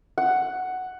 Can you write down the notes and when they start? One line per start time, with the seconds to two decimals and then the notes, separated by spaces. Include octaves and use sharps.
0.18 F#5